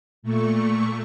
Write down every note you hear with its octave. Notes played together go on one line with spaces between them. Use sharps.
A#2 A3 C#6